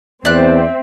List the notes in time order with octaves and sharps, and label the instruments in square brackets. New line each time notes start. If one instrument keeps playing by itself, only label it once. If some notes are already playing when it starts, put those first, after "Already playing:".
[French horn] E2 [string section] C4 [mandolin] D5 F#6 [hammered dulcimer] E5